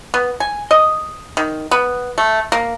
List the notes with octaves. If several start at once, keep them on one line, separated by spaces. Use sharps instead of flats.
B3
G#5
D#5
D#3
B3
A3
A#3